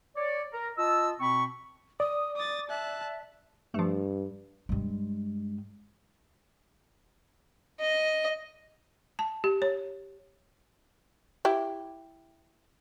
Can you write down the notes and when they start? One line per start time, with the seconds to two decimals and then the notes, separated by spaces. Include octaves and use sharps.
0.16 C#5 D5
0.53 A#4
0.77 F4 D#5 A5 E6
1.20 B2 C4 B5 C#6
2.00 D5 D#6
2.36 D6 D#6 A6
2.69 E5 A5 F#6
3.74 G2 F3 A3
4.69 G2 G#3
7.80 D#5
9.19 A5
9.44 G4
9.62 C#5
11.45 E4 G4